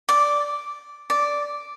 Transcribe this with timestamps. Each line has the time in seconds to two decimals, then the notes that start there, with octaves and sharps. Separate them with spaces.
0.09 D5
1.10 D5